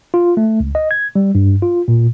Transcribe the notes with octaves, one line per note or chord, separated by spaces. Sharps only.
F4
A3
C#2
D#5
G#6
G3
G2
F4
A#2